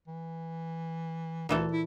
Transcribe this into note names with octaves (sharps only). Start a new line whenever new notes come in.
E3
D2 A#2 E3 A4
E4